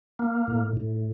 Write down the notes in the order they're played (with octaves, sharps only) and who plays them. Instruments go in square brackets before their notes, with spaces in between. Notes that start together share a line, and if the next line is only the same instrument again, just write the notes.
[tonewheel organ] A#3
A2
A2